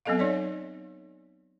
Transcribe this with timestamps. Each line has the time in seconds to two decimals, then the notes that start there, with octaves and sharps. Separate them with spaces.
0.05 F#3 B3 C4 A4 D#5 F5
0.19 D#4 C#5 D5